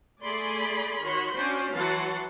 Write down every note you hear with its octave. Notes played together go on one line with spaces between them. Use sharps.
A3 G#4 D5 G#5 B5 C6
D#3 F#4 C#5 B5 C6
C#4 D4 F#4 C5
E3 F#3 F#4 F#5 A5 C6